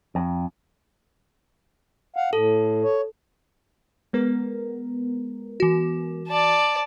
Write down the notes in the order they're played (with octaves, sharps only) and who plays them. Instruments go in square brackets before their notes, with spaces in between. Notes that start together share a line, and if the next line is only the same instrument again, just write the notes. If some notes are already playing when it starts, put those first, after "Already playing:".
[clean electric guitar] F2
[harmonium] F5 F#5
[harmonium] A2 [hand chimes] A4
[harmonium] C#5
[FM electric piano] G#3 B3 A#4
[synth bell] E3 F#4
[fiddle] D5 A5